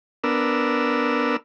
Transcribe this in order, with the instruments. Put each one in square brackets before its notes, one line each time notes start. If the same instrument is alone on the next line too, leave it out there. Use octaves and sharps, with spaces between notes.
[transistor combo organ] B3 D4 A#4 E6